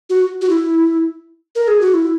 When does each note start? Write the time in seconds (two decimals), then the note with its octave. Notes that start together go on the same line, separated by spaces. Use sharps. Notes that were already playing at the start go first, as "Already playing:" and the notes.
0.10 F#4
0.41 F#4
0.50 E4
1.55 A#4
1.68 G#4
1.81 F#4
1.94 E4